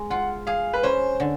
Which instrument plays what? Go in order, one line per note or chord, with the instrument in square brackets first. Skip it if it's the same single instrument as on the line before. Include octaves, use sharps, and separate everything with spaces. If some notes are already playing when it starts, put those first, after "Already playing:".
Already playing: [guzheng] G#3
[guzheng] F4 [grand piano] F#5
[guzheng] G#4 [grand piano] F5
[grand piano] B4
[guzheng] C#4 [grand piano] C5
[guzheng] D3